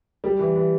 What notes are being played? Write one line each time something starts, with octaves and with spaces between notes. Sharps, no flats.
G3
E3
E3